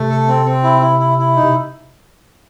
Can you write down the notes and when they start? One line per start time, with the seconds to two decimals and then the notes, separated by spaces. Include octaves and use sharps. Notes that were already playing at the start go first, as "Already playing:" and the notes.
Already playing: C3 A3
0.10 A4
0.28 C4
0.46 C4
0.64 E4
0.81 E4
0.99 E4
1.18 E4
1.36 D#4
1.43 C3